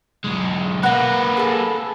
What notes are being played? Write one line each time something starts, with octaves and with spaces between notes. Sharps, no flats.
B1 G#3
A#3 B4 F#5 A#5
G#4 A4